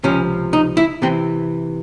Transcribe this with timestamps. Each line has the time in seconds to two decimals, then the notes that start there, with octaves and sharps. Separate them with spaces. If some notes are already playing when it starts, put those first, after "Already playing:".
0.04 C#2 C3 F3 C#4
0.53 D#4
0.77 E4
1.02 C3 E3 C4